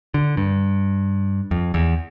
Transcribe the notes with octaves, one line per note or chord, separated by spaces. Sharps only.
D3
G2
F2
E2